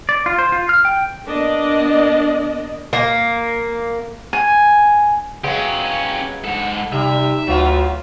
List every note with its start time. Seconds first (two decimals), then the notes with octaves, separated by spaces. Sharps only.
0.09 D5
0.26 F4
0.39 C5
0.52 F4
0.69 F6
0.85 G5
1.28 A#3 B3 D4 D5 D#5
2.93 A#3
4.33 G#5
5.44 F#3 G#3 B3 C#4 G4 F5
6.44 G#2 A4 F#5
6.92 C3 G3 D#4 E5
7.47 D2 F#3 F4